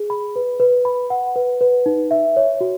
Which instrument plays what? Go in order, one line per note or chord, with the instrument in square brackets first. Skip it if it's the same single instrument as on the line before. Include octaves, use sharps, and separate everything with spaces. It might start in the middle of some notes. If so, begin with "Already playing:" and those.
Already playing: [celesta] G#4
B5
B4
B4
B5
F#5
B4
B4
D#4
E5
C#5
F#4